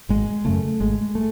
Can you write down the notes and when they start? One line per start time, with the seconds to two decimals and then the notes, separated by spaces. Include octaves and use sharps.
0.09 G#1 G#3
0.45 F#2 C#3 A3
0.81 G#1 G#3
1.15 A3